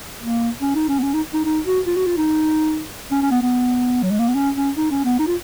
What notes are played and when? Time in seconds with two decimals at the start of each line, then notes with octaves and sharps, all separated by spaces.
0.20 A#3
0.62 C#4
0.75 D#4
0.89 C#4
0.99 B3
1.03 C#4
1.14 D#4
1.34 D#4
1.45 D#4
1.66 F#4
1.87 F4
1.96 F#4
2.06 F4
2.17 D#4
3.11 C#4
3.22 C#4
3.31 B3
3.42 B3
4.02 F#3
4.11 G#3
4.19 A#3
4.28 B3
4.35 C#4
4.56 C#4
4.77 D#4
4.91 C#4
5.05 B3
5.19 D#4
5.27 F4